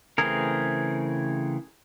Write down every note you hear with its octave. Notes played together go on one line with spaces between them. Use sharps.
C#3 E3 A3 C4 G#4 A#4